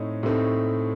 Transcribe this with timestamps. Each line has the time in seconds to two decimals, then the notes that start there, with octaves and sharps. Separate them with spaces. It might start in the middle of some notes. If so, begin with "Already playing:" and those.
Already playing: A2 A3 C4 D#4 C#5 D#5
0.23 A2 A3 C4 D#4